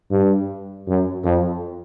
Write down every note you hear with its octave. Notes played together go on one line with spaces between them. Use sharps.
G2
F#2
F2